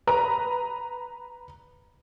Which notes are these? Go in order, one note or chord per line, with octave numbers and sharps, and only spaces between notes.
B4 A#5